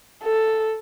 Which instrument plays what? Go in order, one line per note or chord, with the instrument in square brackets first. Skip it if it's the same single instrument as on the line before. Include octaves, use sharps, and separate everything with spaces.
[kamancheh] A4